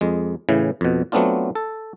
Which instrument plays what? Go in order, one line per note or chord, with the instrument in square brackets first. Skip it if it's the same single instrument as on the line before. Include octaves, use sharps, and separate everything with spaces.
[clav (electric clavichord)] F2 G#3
A2 C#3 E3
F2 B2
F#3 A3 B3 C4 D4 F4
A4